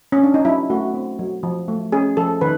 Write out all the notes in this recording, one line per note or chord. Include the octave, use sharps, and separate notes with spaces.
C#4
D4
D#4
F#3 E4
A3 F#4
C4
F#3
F3
A3
C#4 G#4
F3 A4
D#3 B4